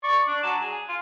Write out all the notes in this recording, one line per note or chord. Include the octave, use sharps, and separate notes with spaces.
D5 C#6
D4
F#3 A5
G#4
F4